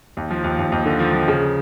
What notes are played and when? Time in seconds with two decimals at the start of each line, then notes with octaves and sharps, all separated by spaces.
0.17 D#2
0.31 F3
0.44 D#2
0.59 D#2
0.72 D#2
0.86 D3
0.99 F3
1.13 F3
1.28 C#3